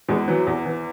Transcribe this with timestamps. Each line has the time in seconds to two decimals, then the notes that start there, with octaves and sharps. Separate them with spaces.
0.08 E2 G#3
0.28 E3 F#3
0.47 E2
0.66 E3